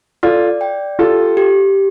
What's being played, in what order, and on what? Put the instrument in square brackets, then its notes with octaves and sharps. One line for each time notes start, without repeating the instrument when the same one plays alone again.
[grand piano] F4 A4 [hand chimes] D5
[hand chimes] G5
[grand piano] F4 A4 [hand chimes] G4
[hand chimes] G4